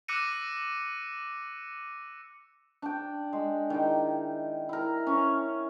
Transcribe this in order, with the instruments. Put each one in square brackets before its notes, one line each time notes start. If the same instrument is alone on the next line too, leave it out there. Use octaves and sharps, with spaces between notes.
[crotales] D6 E6 F#6 A#6 C#7 D#7
[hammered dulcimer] D4 G5
G#3
D#3 E4 G5
E4 A#4
C#4 C#5